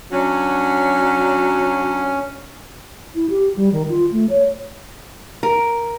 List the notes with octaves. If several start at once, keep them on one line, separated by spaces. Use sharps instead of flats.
F#3 C#4 D4
E4
G4
G3
D#3
F4
A3
C#5
A#4